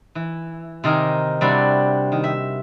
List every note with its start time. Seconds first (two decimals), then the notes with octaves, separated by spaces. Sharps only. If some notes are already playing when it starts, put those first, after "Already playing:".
0.15 E3
0.84 C3 D#3 D#4 A#4 G#5
1.41 C3 G3 D4 E4 F#4
2.12 D#3
2.24 E5